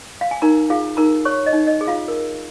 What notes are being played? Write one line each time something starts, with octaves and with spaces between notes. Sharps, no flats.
F5
G#5
D#4 A#4 A#5
F4 G#4 F5
D#4 A#4 A#5
C#5 C#6
D#5
D#4
D#5
G#4
F4 F5
A#4